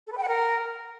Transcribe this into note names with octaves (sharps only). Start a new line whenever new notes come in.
A4
B4
G5
F#5
A#4